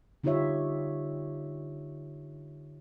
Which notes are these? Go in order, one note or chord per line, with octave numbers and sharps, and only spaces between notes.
D3 D#4 F4 G4 C#5 E5